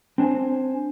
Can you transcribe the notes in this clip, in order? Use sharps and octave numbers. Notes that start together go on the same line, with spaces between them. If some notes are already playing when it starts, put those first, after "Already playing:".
C4 D4 C5 G#5